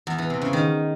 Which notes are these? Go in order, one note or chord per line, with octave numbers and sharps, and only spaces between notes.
E2
E3
C3
C#3
D#3